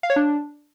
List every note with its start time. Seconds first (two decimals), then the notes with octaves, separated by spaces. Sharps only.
0.03 F5
0.10 C#5
0.16 D4